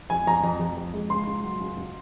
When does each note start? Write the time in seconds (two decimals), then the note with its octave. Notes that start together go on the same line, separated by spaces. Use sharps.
0.10 F2 G#5
0.27 F2 A#5
0.43 F2
0.60 F2
0.77 F2
0.94 G#3
1.10 C#2 C6
1.27 C#2
1.43 F#3
1.60 C#2
1.76 C#2